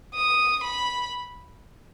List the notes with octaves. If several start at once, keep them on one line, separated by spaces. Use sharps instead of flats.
D#6
B5